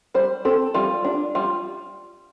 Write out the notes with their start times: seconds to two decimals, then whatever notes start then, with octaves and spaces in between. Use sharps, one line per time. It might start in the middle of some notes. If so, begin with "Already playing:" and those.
0.14 G3 C5
0.45 C4 A4
0.74 G3 F4
1.04 D4
1.35 G3 F4